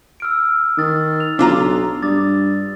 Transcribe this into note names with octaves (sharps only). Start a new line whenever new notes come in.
E6 F6 D7
D#3 D#6 A6
F7
B1 D4 F4 A#5 D6
G2 D6 D#6 A6